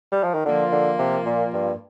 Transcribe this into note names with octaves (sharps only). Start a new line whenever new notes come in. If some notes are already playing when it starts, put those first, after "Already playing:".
G3
F3
D#3
D3 F3 A#3 F4
D3
C3
A#2
G2